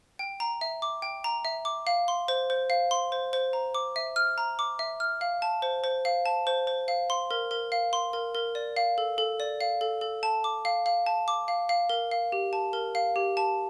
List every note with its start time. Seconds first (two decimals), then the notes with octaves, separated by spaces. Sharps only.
0.19 G5
0.40 A#5
0.61 E5
0.82 D6
1.02 G5
1.24 A#5
1.45 E5
1.65 D6
1.87 F5
2.08 C6
2.28 C5
2.50 C5
2.70 F5
2.91 C6
3.12 C5
3.33 C5
3.53 A#5
3.75 D6
3.96 E5
4.16 F6
4.38 A#5
4.59 D6
4.79 E5
5.00 F6
5.21 F5
5.42 A5
5.62 C5
5.84 C5
6.05 F5
6.26 A5
6.47 C5
6.67 C5
6.88 F5
7.10 C6
7.31 A#4
7.51 A#4
7.72 F5
7.93 C6
8.13 A#4
8.35 A#4
8.55 D5
8.77 F5
8.98 A4
9.18 A4
9.40 D5
9.61 F5
9.81 A4
10.01 A4
10.23 A5
10.44 D6
10.65 F5
10.86 F5
11.06 A5
11.28 D6
11.48 F5
11.69 F5
11.89 A#4
12.11 F5
12.32 G4
12.53 A5
12.73 A#4
12.95 F5
13.16 G4
13.37 A5